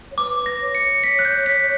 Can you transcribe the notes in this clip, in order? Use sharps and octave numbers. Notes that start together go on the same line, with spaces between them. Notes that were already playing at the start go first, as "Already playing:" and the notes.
C#5
B4 D6
A#6
C#5
C#7
B6
F#6
G6
B6